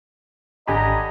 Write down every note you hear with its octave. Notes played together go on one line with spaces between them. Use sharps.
G#1 D3 G4 D#5 G#5 A#5 B5